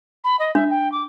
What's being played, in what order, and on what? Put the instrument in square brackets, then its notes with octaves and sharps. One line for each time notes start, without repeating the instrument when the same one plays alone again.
[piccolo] B5
D#5
[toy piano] D4 [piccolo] E5
[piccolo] G5
D6